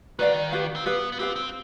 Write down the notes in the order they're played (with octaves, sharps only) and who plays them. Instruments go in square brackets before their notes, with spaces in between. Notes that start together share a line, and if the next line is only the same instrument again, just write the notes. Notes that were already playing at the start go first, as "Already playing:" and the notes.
[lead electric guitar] D#3 [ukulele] B4 D5 F5
[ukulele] G4 B4 F5
[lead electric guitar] C4
[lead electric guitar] B3 [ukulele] G4 B4 F5
[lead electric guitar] B3
[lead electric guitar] C4 [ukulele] G4 B4 F5
[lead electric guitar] C4